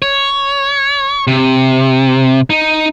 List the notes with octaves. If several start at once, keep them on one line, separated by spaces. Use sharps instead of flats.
C#5
C3
D#4